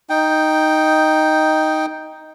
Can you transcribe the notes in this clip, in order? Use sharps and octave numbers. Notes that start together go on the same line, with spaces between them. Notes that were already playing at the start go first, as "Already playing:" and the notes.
D#4 G5